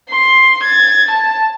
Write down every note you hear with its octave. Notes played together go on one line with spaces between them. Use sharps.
C6
G#6 A6
A5